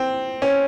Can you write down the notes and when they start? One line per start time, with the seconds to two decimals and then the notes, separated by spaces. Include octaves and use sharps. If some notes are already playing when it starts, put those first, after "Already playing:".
Already playing: C4
0.42 C#4